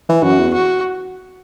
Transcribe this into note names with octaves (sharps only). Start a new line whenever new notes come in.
E3
F#2 F#4
E2
F#4